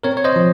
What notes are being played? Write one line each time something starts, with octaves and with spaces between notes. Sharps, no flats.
C4 A#4 C#5
C#5
C5 D#5
F3